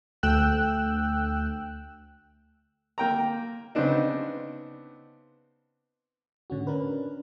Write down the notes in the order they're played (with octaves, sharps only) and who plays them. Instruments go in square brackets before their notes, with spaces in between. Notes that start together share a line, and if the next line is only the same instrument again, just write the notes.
[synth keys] D2 A3 G5 E6 F#6
[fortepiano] A#3 G5 A#5
C#3 B3 C4 D4 D#4
[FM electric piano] A2 D3 C#4 F#4
C#4 D4 A#4 B4